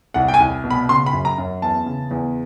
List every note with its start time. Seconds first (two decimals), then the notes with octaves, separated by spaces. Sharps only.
0.14 C2 F#5
0.28 G5
0.34 G#5
0.40 C2
0.64 B2
0.71 B5
0.88 C#3 C6
1.06 B5
1.13 F#2
1.25 A#5
1.38 F#2
1.62 E2 A5
1.86 C#3
2.11 E2